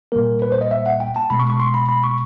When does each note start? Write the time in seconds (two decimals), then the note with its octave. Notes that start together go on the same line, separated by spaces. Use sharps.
0.12 A#2 G3 A#3 A#4
0.42 B4
0.52 C5
0.61 D#5
0.71 E5
0.86 F#5
1.00 G5
1.16 A5
1.30 B2 G#3 B3 B5
1.39 C#6
1.50 C#6
1.60 C6
1.74 B5
1.89 B5
2.04 C#6